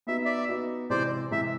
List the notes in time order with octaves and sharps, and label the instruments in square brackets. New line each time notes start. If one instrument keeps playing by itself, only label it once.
[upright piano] B3 D#4 F#4 [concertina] E5
[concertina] D5 E5
[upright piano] B3 D#4 F#4
[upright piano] C3 E3 G#3 [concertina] C5 D5
[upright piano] C3 E3 G#3 [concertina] E5